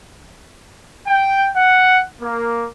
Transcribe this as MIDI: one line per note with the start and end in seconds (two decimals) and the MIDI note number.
1.07 1.49 79
1.56 2.00 78
2.21 2.65 58